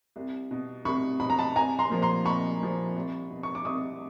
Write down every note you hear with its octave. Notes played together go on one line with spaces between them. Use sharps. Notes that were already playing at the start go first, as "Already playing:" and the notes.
C2
B2
C2 B5 C#6
B2 B5
A#5
A5 B5
C2 G#5 A#5
A#5 C6
A#2 F3
A#5 C6
C2 B5 C#6
A#2 F3
C2
B2
C#6
D6
C2 C#6 D#6